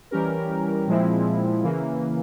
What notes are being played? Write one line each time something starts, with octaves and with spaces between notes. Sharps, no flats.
E3 G3 C#4 G4 A#4
A#2 F3 G#3 C4 E4
C#3 E3 A#3